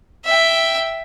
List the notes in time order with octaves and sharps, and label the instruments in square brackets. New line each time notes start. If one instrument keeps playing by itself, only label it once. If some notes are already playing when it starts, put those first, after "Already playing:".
[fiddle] E5 G5